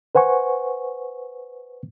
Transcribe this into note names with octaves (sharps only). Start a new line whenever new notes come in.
B4 C5 F#5 G#5 C#6